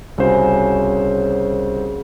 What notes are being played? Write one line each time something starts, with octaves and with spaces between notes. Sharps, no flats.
C2 C#3 F#4 C5